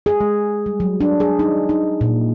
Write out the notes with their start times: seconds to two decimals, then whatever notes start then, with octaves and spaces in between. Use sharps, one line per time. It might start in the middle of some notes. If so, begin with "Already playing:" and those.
0.06 G#4
0.21 G#3
0.66 G3
0.80 F#3
1.01 D4
1.20 G#4
1.39 D#4
1.69 D#4
2.01 A#2